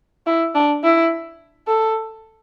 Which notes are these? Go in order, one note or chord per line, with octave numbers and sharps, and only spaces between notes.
E4
D4
E4
A4